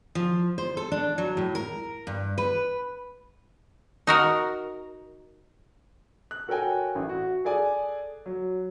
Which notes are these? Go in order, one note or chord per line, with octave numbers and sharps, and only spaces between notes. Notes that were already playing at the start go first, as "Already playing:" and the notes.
F3
C5
A4
D4
F#3
A2
A#4
G2
B4
D#4 F#4 A#4
F#6
F#4 A4 A#4 C#5 G5 G#5
A1
F#4
G#4 A4 D5 G#5
F#3